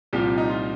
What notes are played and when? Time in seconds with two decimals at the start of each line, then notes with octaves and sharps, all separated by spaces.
0.13 C2 A#2 F3 G4
0.38 D#4
0.50 F4